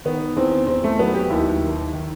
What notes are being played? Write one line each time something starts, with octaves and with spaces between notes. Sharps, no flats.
D#3 B3
E2 C4
E2 C4
A3
F#3 B3
G4
D#2 E4
D#3
D#3